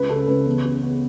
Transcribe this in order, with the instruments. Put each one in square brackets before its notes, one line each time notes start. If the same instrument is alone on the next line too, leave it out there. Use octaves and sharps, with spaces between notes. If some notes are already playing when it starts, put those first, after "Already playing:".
Already playing: [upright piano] C#2 B4
C#3 A4
C#2 B4
E2
C#3
B3